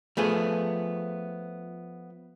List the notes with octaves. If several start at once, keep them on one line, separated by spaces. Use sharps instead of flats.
F3 A3 B3 G#4